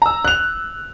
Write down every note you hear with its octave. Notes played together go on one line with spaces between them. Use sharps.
A#5 E6
F#6 F7